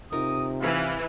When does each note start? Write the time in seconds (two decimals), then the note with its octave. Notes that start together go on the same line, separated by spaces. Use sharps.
0.12 C3 D#4 F4 A#4 D#6
0.61 E3 F5